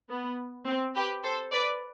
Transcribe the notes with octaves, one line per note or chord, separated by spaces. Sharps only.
B3
C4
G4 B4
A4 C5
B4 D5